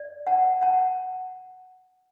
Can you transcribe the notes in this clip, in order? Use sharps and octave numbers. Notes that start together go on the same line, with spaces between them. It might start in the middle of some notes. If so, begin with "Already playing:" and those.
Already playing: D5
F#5 A5
F#5 A5